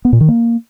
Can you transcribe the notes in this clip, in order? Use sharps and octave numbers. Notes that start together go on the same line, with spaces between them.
B3
A#2
D#3
A#3